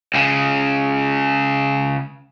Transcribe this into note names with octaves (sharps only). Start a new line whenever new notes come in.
C#2 C#3